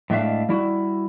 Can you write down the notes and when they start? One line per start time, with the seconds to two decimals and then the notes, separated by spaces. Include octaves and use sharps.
0.10 A2 G#3 D4 E5 F5
0.49 G3 E4 F#4